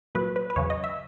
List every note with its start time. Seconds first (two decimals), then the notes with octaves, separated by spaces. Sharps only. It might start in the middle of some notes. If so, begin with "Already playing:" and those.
0.15 A#2 F#3 B4
0.36 B4
0.50 B4
0.56 E2 C#3 F#3 C#5
0.70 D#5
0.84 E5